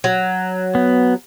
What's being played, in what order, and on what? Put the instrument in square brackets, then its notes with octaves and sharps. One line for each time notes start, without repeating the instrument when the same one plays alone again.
[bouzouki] F#3
[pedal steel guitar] B3